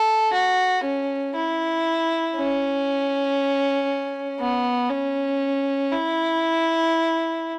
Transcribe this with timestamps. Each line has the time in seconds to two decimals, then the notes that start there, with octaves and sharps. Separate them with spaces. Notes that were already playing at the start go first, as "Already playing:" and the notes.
Already playing: A4
0.33 F#4
0.84 C#4
1.35 E4
2.37 C#4
4.39 B3
4.90 C#4
5.92 E4